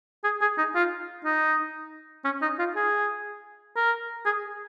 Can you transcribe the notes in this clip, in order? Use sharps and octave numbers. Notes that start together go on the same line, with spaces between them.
G#4
G#4
D#4
F4
D#4
C#4
D#4
F4
G#4
A#4
G#4